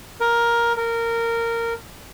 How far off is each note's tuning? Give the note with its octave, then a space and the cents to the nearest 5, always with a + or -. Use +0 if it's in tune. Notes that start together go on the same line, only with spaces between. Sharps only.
A#4 +10
A#4 -15